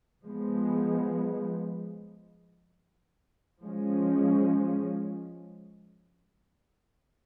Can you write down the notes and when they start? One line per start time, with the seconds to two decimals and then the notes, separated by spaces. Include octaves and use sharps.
0.23 F3 G#3 B3
3.62 F3 G#3 C#4